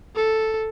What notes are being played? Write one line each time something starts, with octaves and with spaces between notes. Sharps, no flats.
A4